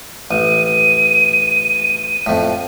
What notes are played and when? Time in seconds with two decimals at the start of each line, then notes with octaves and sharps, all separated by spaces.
0.31 A1 D#7
2.26 F2 A2